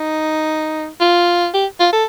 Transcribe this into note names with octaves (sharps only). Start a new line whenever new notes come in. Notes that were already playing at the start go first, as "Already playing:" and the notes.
Already playing: D#4
F4
G4
F4
A4